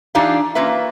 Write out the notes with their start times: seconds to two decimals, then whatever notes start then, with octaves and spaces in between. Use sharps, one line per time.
0.15 E3 D4 D#4 F4 G4 F5
0.55 A#3 C#4 F4 B4 E5